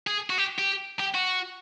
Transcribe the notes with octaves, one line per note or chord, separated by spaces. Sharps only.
G#4
F#4
G4
G4
G4
F#4